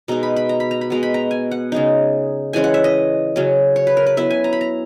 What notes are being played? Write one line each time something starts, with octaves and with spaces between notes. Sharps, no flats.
B2 G#3 D#4 A#5
B5
B5
A#5
B5
A#5
B5
B2 G#3 B3 A#5
B5
A#5
G#5
F#5
C#3 G#3 D#4
E3 G#3 C#4 G#5
F#5
E5
D#5
C#3 F#3 C#4
C#5
B4
A#4
B4
F#3 B3 E4 E5
G#5
A#5
B5
A#5